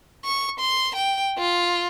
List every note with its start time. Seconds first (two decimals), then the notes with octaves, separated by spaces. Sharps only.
0.25 C#6
0.59 C6
0.95 G5
1.38 F4